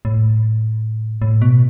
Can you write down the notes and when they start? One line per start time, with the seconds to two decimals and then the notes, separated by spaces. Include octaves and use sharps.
0.05 A2
1.22 A2
1.42 B2